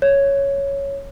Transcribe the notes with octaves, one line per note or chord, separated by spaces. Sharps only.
C#5